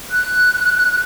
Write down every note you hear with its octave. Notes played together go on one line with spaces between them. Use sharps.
F#6